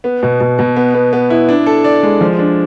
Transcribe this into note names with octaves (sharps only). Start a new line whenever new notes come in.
B3
B2
B2
B2
B3
B3
B3
E4
D4
A4
D5
G#3
F3
D4